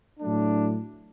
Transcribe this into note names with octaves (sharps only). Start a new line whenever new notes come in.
A2 F#3 A3 D4